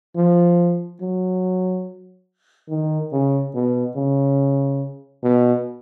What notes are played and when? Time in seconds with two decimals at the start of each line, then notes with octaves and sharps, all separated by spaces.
0.16 F3
1.01 F#3
2.69 D#3
3.12 C#3
3.55 B2
3.96 C#3
5.23 B2